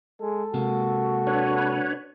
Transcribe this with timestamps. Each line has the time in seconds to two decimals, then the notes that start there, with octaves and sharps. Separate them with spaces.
0.21 G#3 A4
0.54 C3 G#3 A#3 F#4
1.27 D4 B4 C#5